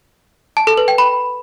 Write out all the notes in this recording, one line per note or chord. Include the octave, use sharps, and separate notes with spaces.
A5
A4
B4
G5
B5